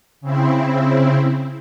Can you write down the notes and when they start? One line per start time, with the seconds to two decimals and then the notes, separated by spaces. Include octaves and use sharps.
0.21 C#3 C4 E4